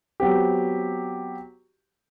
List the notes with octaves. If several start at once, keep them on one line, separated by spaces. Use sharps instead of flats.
F#3 B3 C4 G4